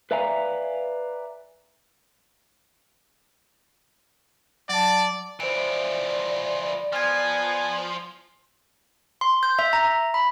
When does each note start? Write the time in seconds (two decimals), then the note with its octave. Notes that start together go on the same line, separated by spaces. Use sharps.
0.11 B4 D5 E5 F5 G#5 A#5
4.69 F#3 D5 A5
5.40 E3 F3 C5 D5 D7
6.93 F3 B3 G#5 F6 G#6
9.21 C6
9.43 G6
9.59 E5
9.73 A#5
10.14 B5